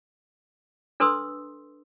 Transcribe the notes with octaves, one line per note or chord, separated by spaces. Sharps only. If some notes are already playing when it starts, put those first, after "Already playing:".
D4 A4 B4 C6 D#6 E6